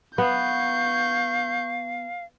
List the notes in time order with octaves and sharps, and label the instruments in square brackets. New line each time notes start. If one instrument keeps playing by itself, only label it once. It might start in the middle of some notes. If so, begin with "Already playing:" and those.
[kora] B3 [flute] F5 [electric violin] C#6 G6